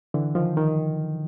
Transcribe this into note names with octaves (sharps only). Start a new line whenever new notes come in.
D3 E3
D#3 F3
D#3